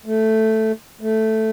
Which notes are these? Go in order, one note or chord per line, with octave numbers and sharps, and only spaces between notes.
A3
A3